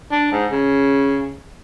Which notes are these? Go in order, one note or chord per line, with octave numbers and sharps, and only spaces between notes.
D4
G#2
C#3